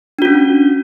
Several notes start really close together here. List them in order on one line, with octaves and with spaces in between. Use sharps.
D4 F#4 C#4